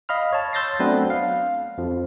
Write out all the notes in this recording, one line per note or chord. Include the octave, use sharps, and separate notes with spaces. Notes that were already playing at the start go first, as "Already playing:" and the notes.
D#5 F5 B5 F6
C#5 A5
C6 E6 G6 A6 A#6 C7
F#3 A3 B3 C4 D4 B4
F5
F2 F3